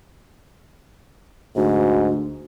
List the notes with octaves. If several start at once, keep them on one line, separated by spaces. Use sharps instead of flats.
D2 G#2 F#4